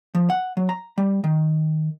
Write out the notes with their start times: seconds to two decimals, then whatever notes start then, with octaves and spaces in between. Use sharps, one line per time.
0.15 F3
0.30 F#5
0.57 F#3
0.69 A#5
0.98 G3
1.24 D#3